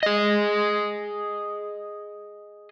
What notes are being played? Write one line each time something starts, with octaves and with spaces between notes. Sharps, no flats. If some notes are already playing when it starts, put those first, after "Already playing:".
G#4 D#5